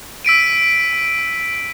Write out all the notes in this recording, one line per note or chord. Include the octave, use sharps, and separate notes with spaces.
E6 B6 D7 D#7